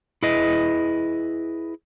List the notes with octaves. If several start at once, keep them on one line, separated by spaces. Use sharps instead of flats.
E4 G#4 B4 D#5